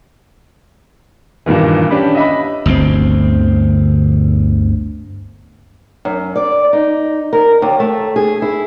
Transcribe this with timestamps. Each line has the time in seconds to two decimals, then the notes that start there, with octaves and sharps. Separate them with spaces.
1.46 G2 A#2 D#3 E3
1.90 C#4 D4 G4 B4
2.15 D#5 E5 B5
2.66 G1 D2 C3 C4
6.05 F#2
6.36 D5
6.73 D#4
7.33 A#4
7.62 D#2
7.80 A3
8.16 G#4
8.42 E4